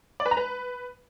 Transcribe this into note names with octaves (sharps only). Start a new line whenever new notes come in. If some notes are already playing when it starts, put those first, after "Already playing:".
D5
B4
A#5
B4